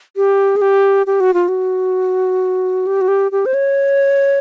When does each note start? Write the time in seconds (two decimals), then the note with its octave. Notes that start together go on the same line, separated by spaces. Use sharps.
0.17 G4
0.56 G#4
0.62 G4
1.07 G4
1.20 F#4
1.34 F4
1.48 F#4
2.87 G4
3.01 F#4
3.08 G4
3.32 G4
3.46 C5
3.54 C#5